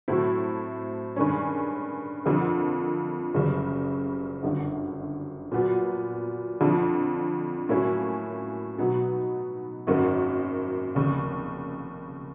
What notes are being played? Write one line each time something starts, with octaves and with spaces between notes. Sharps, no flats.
A2 F#3 A3 C4 E4
G2 D#3 G#3 C#4
F2 D3 F3 A#3
F#1 F#2 C#3 E3 G3
G1 F#2 D3
A#2 F#3 B3
F2 D3 F3
A2 F#3 A#3 C#4 E4
B2 F#3 B3 D#4
G#1 F#2 D#3 F#3 A#3
F1 D#2 C#3